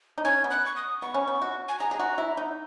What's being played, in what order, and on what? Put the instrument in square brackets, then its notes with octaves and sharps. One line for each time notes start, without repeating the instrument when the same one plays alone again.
[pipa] D#4
[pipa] C#4 [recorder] G#6
[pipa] B3
[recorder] F#6
C#6
D#6
[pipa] B3 [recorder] C#6
[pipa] C#4
B3
F#4
[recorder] G#5
[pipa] G#4 [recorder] A#5
[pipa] G#4
F#4
E4
D#4